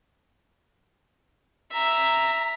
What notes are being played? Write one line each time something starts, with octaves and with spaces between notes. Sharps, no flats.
E5 A#5